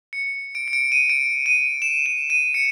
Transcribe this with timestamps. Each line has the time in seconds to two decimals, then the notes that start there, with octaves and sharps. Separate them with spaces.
0.13 C#7
0.55 D7
0.68 C#7
0.73 D7
0.92 D#7
1.10 D7
1.46 D#7
1.82 E7
2.06 E7
2.30 D#7
2.54 C#7